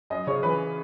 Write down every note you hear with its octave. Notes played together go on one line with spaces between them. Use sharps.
F#2 D#5
C#3 C#5
E3 B4